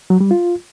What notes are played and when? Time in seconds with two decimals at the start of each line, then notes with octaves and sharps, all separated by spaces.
0.10 F#3
0.21 G3
0.31 F4